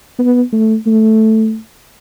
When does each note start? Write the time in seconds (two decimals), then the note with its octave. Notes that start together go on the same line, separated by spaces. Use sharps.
0.19 B3
0.53 A3
0.86 A3